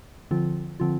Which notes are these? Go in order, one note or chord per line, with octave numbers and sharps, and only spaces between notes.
D3 F3 C4 F4
D3 F3 C4 F4